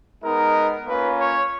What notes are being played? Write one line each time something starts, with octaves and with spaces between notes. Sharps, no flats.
G#3 B3 D#4 A#4
A#3 C#4 F4 B4
C#5